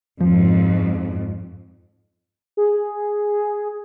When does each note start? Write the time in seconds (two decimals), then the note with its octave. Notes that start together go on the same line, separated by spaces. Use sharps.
0.21 F2 G#2 F3
2.57 G#4